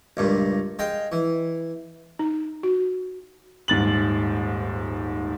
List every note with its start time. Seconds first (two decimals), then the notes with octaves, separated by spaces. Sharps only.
0.17 C#2 G2 A#2
0.79 G#3 F5 G5
1.12 E3
2.19 D#4
2.63 F#4
3.68 D#1 G#2 A6 F#7